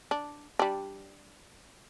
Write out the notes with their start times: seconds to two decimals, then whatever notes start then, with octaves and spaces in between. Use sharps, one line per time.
0.11 D4
0.59 G3 D4